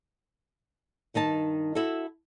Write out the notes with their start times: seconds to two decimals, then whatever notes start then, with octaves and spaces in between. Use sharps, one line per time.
1.14 G2 D#3 D#4 A5
1.75 E4 F#4 A4